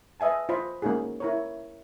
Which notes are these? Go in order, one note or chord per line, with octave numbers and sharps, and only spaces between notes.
B4 D#5 E5 G#5 A5
F4 C5 D#5 B5
A3 A#3 C#4 D#4 F#4 G#4
E4 A#4 C#5